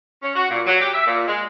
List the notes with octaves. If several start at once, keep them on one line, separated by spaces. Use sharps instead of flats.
C#4
F#4
A#2
F#3
G4
E5
A#2
G#3